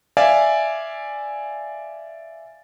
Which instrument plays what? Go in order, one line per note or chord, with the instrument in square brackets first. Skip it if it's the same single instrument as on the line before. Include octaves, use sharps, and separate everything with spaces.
[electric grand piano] D5 E5 F5 G#5